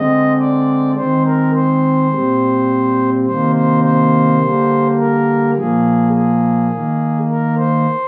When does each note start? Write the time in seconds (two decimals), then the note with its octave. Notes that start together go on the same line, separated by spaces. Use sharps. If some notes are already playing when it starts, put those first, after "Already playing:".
Already playing: D3 G#3 C4 D#5
0.40 D5
0.97 D#3 G#3 C4 C5
1.25 A#4
1.55 C5
2.11 A#2 G3 C4
3.27 C3 D#3 A#3 C5
3.56 C5
3.84 C5
4.41 D3 G3 A#3
4.99 A#4
5.57 A#2 F3 A#3 G#4
6.15 G#4
6.71 D#3 A#3
7.29 A#4
7.58 C5